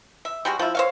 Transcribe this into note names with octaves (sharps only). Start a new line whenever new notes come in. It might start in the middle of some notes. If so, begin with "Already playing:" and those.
E5
G3 G#3 F#4
F3 E4
C5 C#5 F5